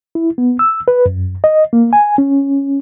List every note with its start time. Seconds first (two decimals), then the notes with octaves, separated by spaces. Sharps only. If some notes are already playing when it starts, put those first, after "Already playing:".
0.15 E4
0.38 B3
0.59 E6
0.88 B4
1.06 F#2
1.44 D#5
1.73 A#3
1.93 G#5
2.18 C#4